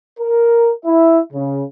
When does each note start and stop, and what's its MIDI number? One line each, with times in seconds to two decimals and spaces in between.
0.20 0.71 70
0.86 1.20 64
0.86 1.20 76
1.32 1.63 49